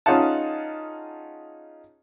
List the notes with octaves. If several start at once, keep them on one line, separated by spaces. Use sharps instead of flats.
C#4 D#4 F4 G#4 F#5 A5